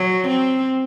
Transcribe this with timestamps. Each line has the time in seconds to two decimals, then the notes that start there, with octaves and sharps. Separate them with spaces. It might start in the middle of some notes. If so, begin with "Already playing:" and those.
Already playing: F#3
0.28 C4